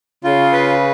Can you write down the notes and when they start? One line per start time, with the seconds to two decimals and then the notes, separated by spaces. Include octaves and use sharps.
0.24 C#3 F4
0.52 B4